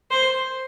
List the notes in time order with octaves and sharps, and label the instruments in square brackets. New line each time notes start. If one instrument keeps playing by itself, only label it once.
[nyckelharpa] C5